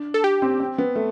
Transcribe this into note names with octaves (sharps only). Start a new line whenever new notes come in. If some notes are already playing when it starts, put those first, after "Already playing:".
Already playing: D4
A4
G4
C4
C4
B3
A3